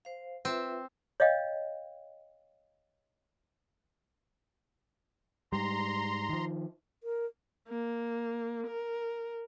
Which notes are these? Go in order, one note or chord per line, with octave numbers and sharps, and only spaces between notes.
C5 F5
C4 F4 B4 E5
C#5 D#5 F5 G5
G#2 G3 A#5 C6
D#3 F3
A#4
A#3
A#4